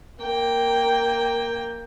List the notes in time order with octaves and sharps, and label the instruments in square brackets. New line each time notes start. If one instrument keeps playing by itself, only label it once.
[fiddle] A#3 G5